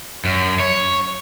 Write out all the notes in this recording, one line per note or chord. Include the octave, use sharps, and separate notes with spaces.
F#2
C#5